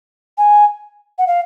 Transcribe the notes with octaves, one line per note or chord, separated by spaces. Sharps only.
G#5
F#5
F5